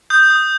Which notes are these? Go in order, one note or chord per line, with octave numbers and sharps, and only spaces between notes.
D#6 G6
D#6